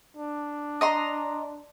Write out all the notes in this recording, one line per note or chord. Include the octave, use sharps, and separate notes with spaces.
D4
D#5 A#5 C6